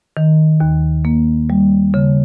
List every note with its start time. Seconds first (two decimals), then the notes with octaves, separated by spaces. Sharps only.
0.17 D#3
0.60 D#2
1.05 A#3
1.50 G3
1.94 C#3